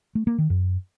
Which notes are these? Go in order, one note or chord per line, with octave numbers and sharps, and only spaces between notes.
A3
A#3
D#3
F#2